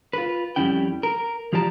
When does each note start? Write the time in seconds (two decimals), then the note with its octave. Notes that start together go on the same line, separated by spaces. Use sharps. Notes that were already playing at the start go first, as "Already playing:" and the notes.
0.13 F4 B4
0.56 F2 G3 C#4 E4 G5
1.03 A#4
1.53 F3 F4 G4 D5 A5 A#5